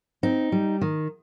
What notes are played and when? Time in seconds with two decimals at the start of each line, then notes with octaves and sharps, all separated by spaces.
0.23 C4 D#4
0.52 G3
0.81 D#3